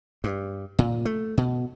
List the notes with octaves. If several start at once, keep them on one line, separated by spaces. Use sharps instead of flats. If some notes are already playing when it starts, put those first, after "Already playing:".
G2
A#2
A3
B2